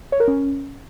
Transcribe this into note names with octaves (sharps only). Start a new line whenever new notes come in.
C#5
A#4
C#4